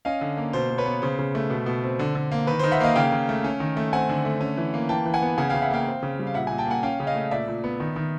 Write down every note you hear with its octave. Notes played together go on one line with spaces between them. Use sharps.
C#4 D#5 F5
D3
A#3
B2 C5
B2
B4 C#5
B3
C#3 C5
C#3
A3
B2
B2
C4
D3
D3
A#3
D#3 B4
D#3 C5
E5 F#5
A#3 D#5 F5
C#3 F5 G5
C#3
A3
C#4
D#3
A3
C4 F#5 G#5
D3
A3
C#4
E3
A#3
E3 G5 A5
E3
F#5 G#5
B3
C#3 F#5 G#5
C#3 F5 G5
E5 F#5
A#3 F5 G5
C4
C#3
G3
F5
A#2 E5 F#5
A#2 F#5 G#5
G5 A5
A#3 F#5 G#5
C#4 F5 G5
C#3
D#5 F5
A3
A#2 D5 E5
A#2
B3
D#3
D#3